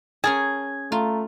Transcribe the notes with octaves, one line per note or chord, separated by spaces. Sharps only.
C#4 G#4 A#4 A5 G#6
A3 F4 A#5